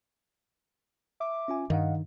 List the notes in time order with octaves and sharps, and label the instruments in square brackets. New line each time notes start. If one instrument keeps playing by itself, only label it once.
[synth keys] E5 D6
[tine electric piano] C#4 F4 G#5
[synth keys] G2 [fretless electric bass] D#3 [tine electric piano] D#5 F5 F#5